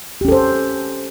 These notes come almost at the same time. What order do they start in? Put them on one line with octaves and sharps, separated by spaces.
G4 C#4 A4 C5